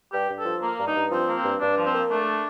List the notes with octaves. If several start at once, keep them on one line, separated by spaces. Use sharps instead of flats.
G2 G4
G2
A4
F3
A#3
G2
D#4
G2
F3 C4
A#3
C4
G2
G2 D4
F3
C4
A#3
A3 D4